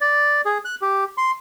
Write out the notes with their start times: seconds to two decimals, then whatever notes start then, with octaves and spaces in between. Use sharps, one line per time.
0.01 D5
0.46 G#4
0.65 F#6
0.82 G4
1.18 C6